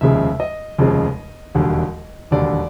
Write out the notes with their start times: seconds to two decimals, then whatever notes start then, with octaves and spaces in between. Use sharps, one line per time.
0.01 F1 D#2 C#3 F3 G#3 E5
0.40 D#5
0.78 F1 D#2 C#3 F3 G#3
1.55 E1 D#2 D3 G3
2.31 E1 D#2 D3 G3 D5